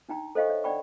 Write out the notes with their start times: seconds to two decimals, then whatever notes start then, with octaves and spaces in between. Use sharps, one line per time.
0.09 D4 D#4 G5 A#5
0.35 A4 C5 D#5 F5 G5 C#6
0.49 C#5 E5
0.64 D4 D5 F#5 G5 B5 C#6